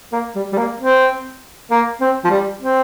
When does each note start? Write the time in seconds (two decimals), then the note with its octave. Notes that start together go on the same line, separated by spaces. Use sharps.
0.12 A#3
0.35 G3
0.53 G3
0.58 A#3
0.80 C4
1.71 A#3
2.01 C4
2.24 F3
2.30 G3
2.61 C4